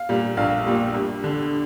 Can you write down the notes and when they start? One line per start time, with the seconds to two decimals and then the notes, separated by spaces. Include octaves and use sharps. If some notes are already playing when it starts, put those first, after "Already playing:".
Already playing: F5
0.09 A#2 G3
0.37 A#1 F5
0.67 A#2 G3
0.94 G2
1.22 D3 G3